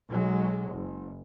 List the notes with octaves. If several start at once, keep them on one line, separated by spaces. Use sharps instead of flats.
B1 F#3 G#3
F#1